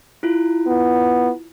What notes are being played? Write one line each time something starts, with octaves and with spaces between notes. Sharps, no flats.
E4 F4
B3